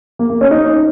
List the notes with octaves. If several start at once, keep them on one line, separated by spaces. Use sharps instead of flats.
A#3
A#3
C#4
D#4